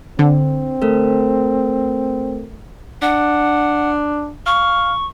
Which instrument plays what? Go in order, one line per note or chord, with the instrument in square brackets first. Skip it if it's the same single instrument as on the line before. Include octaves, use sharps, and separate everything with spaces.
[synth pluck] D3 [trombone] C4
[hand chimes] A3 A4 A#4
[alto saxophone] D4 [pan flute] F#5
[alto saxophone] F5 [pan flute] C#6